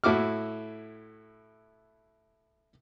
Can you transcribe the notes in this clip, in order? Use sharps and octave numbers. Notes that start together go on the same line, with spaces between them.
A2 E4 F#4 D6 F6